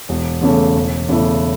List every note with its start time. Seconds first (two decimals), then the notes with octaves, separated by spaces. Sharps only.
0.09 E1
0.41 E2 C#3 A3 C#4
0.74 E1
1.08 E2 C#3 A3 E4